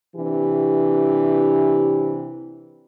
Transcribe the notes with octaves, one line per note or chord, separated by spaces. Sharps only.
C3 E3 D4 G4